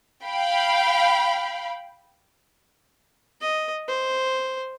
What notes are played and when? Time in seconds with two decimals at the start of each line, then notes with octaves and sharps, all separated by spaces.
0.25 F5 G5 B5
3.41 D#5
3.88 C5